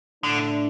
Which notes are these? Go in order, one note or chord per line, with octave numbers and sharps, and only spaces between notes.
A2 D3 A3 D4